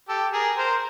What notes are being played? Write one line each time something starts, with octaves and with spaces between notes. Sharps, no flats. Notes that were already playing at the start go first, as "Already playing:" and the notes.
G4 A4
G#4 A#4
A#4 C5